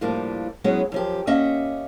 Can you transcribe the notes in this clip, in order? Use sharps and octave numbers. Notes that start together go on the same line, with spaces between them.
A2 F3 G3 A#3 D4
F#3 G#3 B3 C#4 E4
F#2 F3 G4
A#3 C#4 D#5 E5 F#5